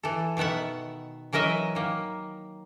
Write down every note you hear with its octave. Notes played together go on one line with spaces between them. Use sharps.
E3 A4
B2 D#3 B3 E5 F#5
E3 F#3 A#4 D#5 E5
D#3 A#3